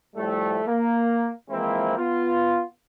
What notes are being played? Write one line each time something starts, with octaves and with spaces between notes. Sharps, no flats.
A2 F3 G3 A3
A#3
E3 F3 G#3 A#3 C4 E4
B3 F4